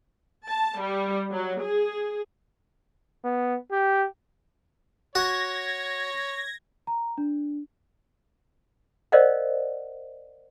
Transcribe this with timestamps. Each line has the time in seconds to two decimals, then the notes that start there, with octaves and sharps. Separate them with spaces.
0.48 A5
0.82 G3
1.32 F#3
1.62 G#4
3.24 B3
3.71 G4
5.15 F#4 C#5 G#6 A#6
6.87 A#5
7.18 D4
9.12 A#4 C5 D5 D#5 F5 F#5